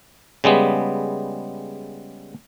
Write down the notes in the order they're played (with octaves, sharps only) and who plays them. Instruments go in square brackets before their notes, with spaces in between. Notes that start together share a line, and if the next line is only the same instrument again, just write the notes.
[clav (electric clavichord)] C#3 G3 G#3 B3